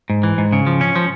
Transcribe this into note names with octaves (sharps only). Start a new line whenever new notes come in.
G#2
E3
G#2
C#3
F3
C#4
F3